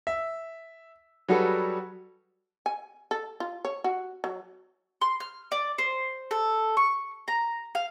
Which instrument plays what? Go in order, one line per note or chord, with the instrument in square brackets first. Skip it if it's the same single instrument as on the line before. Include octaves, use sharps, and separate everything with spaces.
[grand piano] E5
F#3 G3 F#4 G#4 A4 B4
[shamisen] G#5
A4
F4
C#5
F#4
F#3
[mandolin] C6
F6
D5
C5
A4
C#6
A#5
F5